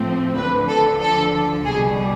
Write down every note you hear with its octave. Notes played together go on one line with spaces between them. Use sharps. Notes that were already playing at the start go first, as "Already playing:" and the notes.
Already playing: A2 F3 A3 C4
D2 D3 F3 B4
A4
A4
C2 B2 G3 G#4